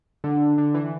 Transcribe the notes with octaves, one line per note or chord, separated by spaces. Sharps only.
D3
D3
E3